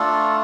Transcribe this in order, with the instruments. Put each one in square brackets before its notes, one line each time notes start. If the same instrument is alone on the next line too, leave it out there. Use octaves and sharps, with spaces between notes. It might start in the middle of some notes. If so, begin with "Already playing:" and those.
Already playing: [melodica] A3 D4 F4 A4